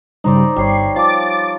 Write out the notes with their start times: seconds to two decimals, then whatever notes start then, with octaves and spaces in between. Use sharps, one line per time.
0.24 G2 C#3 G3 D#4 C5 D5
0.56 G1 G3 C#5 C7
0.96 F3 D6 A6